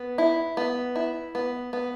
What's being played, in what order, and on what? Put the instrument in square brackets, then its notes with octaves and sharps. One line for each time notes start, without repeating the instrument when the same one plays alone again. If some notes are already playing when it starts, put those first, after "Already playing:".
Already playing: [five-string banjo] B3
E4
B3
E4
B3
B3